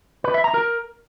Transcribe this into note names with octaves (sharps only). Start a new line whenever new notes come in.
B4
E5
A#5
A#4